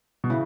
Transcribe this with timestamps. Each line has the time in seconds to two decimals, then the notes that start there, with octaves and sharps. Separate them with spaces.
0.24 B2
0.29 A2 C#3 E3